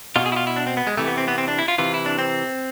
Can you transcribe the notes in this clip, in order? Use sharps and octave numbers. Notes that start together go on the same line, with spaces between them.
B2 F4
G#4
E4
F4
E4
D4
C4
B3
G#3
C3 E3 A3
B3
C4
B3
C4
D4
E4
F4
C3 E3 F4
E4
D4
C4